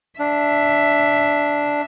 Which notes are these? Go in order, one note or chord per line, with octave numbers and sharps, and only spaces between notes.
D4 E5